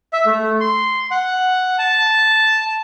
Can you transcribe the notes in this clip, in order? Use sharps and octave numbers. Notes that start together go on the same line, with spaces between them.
E5
A3
C6
F#5
A5